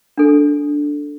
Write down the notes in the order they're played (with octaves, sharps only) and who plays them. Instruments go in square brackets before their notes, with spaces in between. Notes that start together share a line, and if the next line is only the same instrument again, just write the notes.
[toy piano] D4 A4